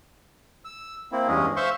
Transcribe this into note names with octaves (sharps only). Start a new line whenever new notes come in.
E6
A#3 C4 E4
E2 G2 G#3 C#4 G#4
C5 E5 F5 C6 C#6